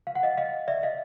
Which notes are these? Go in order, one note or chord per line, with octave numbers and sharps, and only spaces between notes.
F5
F#5
D#5 F5
D#5 F5
D5 E5
D#5 F5